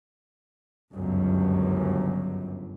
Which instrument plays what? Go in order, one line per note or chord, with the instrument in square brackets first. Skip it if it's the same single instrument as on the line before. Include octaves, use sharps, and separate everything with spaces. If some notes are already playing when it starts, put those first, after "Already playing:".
[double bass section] G1 C#2 F#2